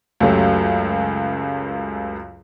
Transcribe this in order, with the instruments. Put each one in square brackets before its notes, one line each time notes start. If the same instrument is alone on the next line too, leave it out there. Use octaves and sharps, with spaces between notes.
[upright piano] C#2 F#2 F#3 A3 G4